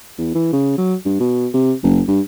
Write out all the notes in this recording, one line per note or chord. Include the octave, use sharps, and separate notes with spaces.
E2
E3
C#3
F#3
G2
B2
C3
F#1
G2